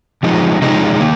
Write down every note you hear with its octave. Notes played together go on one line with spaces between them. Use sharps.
C3 F3 G#3 D#4
C3 F3 G#3 D#4
D#3 A#3